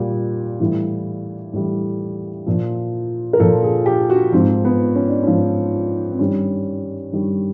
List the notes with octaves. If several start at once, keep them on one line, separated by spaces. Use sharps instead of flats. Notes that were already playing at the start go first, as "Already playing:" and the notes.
Already playing: A#2 G3
A2 E3 G3
A2 E3 G3
A#2 F3
A#4
A#2 F3 A4
G#4
G4
F#4
G#2 F3 C4
B3
C#4
D4
G#2 F3 C#4
C4
G2 D#3 G3 C#4
G2 D#3 G3